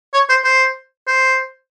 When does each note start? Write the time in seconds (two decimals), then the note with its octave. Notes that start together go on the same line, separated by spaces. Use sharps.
0.14 C#5
0.29 C5
0.44 C5
1.07 C5